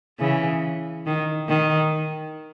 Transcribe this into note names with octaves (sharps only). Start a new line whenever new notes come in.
C#3 E3
D#3
D#3